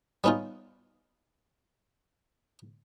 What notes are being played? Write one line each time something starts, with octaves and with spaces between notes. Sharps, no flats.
G3 B3 C#4 D#4 F4